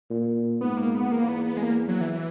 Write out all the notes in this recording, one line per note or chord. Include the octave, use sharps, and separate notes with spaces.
A#2
G#2 B3
A#3
B3
E2 A#3
B3
B3
G#3
A#3
F#3
E3
E3